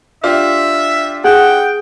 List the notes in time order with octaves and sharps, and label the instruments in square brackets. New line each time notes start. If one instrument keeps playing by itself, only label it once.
[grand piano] D4 F4 G4 [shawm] E5
[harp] G#4 [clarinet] F#5 [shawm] G5